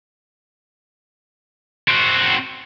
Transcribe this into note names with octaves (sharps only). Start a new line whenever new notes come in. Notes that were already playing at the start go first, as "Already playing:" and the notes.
C4 F#4